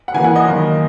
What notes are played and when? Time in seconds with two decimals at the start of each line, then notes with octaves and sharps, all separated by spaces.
0.08 F#5
0.14 C#3 E3 A#3 G#5
0.24 F#5
0.36 D#5
0.45 F#2 D#3 A#3